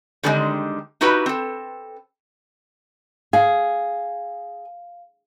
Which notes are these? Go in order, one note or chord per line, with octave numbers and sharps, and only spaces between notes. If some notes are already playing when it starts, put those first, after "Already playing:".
B2 D3 D#3 G3 G#3 C4
D#4 E4 F#4 G4 B4
C4 A4
G#4 F5